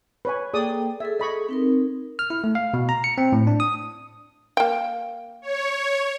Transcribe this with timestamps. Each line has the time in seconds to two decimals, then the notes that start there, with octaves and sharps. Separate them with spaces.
0.25 B4 C#5 G#5
0.54 A#3 G#4 A4 D5 G5 D#6
1.00 G#4 A4 E5
1.20 G#4 A4 D#5 B5 C#6
1.49 C4 D#4 A#4
2.19 F6
2.30 E4
2.44 A3
2.55 F5
2.74 B2
2.89 A#5
3.04 C#7
3.18 C4
3.32 A2
3.47 D4
3.60 D#6
4.57 A#3 G5
5.42 C#5